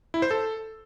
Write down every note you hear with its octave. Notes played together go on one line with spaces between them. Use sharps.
E4
C5
A4